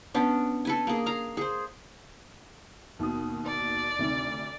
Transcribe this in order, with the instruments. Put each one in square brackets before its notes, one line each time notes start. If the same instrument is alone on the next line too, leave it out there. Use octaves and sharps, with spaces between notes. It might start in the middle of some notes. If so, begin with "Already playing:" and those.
[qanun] B3 C#4 D4
A4 B4 G#5
A#3 G#4
F5 A#5
G#4 C5
[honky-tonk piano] D#2 B2 D#6
[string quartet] D5
[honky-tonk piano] D2 C3 D#3